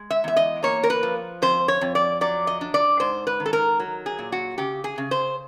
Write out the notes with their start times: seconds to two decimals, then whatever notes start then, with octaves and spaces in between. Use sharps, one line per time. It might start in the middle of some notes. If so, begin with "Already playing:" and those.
Already playing: G#3
0.11 E5
0.24 E2 E5
0.37 D#5
0.63 A#3 C#5
0.84 A#4
0.90 B4
1.03 F3
1.42 F2 C5
1.68 C#5
1.81 F2
1.95 D5
2.21 F#3 D5
2.47 D#5
2.61 D4
2.74 D5
3.00 G#2 C5
3.27 B4
3.40 D#3
3.46 A4
3.53 A#4
3.79 F#3
4.06 G#4
4.19 A#2
4.32 F#4
4.58 C#3 G4
4.84 G#4
4.98 C#3
5.11 C5